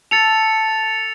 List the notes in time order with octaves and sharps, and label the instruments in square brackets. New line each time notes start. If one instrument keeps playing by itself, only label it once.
[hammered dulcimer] A4 [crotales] A6 C#7 F7